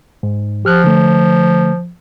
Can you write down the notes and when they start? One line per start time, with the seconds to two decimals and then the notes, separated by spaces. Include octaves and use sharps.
0.23 G#2
0.65 F3 G4 F6 F#6
0.84 D3 A3